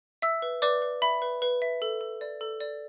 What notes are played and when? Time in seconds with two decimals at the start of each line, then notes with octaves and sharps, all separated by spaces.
0.22 E5 E6
0.42 B4
0.62 B4 D5 D6
0.82 B4
1.02 E5 B5
1.22 B4
1.42 B4
1.62 E5
1.82 A4
2.01 A4
2.21 D5
2.41 A4
2.60 D5